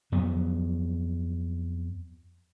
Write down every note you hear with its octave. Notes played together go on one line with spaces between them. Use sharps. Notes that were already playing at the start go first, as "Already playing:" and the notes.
F2 F#3 B3